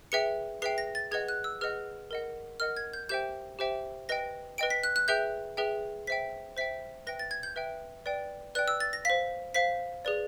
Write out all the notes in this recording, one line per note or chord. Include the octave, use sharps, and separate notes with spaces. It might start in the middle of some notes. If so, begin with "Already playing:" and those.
G#4 B4 E5 G5 C#7
G#4 B4 E5 G5 C7
A#6
A6
G#4 B4 D#5 F#5 G#6
F#6
E6
G#4 B4 D#5 F#5 F6
A#4 D#5 F#5
A#4 D#5 F#5 F6
G#6
G6
G4 C5 E5 G5 G6
G4 C5 E5 G5
B4 D#5 G5 A#6
B4 D#5 G5 D7
B6
F#6
F#6
G#4 B4 E5 G5 G6
G#4 B4 E5 G5
C5 E5 G5 B6
C5 E5 G5 B6
B4 E5 G5 A#6
A6
G#6
G6
B4 E5 G5
B4 D5 G5
B4 D5 G5 F#6
E6
A6
A#6
C5 F5 B6
C5 F5 B6
G#4 B4 D5